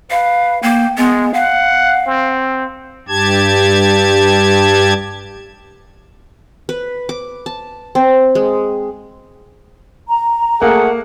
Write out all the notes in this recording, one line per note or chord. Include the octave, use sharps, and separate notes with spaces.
B4 F5
A#3 G5
G#3 B3
F5 F#5
C4
G2 G4 A5 G#6
B4
D6
A5
C4
G#3
A#5
A3 A#3 G#4 F#5